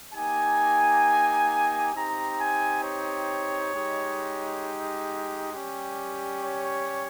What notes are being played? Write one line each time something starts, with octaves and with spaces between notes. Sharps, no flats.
A#3 D#4 G4 G#5
C4 D#4 G4 A#5
G#5
C#5
G#3 D#4 G4
G3 C#4 G4
C#5